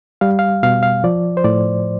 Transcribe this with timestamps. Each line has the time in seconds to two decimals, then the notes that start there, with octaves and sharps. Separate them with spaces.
0.21 G3 F5
0.39 F5
0.63 B2 F5
0.83 F5
1.04 F3 D5
1.37 C5
1.44 A2 D5